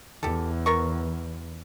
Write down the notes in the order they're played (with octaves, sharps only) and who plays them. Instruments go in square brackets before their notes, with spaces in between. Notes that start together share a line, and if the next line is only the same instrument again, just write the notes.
[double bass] E2 [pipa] G4 A4
[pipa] B3 A#4 C#6